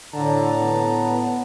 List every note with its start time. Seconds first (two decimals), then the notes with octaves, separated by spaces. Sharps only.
0.13 A2 D3 A5 A#5
0.63 B3